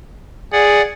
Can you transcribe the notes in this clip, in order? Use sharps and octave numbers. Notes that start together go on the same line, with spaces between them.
G#4 D5 F#5